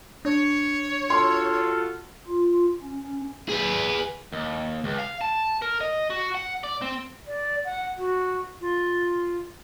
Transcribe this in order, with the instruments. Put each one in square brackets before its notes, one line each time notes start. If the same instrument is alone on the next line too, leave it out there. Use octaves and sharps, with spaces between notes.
[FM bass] D4 [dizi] C#5
[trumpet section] F4 F#4 A4 [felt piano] C6
[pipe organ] F4
C#4
[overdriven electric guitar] G#4 B4
D#2
C#2
F5
A5
A#4
D#5
F#4
F#5
D5
C4
[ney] D5
F#5
F#4
[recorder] F4